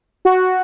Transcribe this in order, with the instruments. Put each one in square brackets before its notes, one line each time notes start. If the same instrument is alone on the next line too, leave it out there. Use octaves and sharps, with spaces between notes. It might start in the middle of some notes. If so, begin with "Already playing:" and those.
[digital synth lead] F#4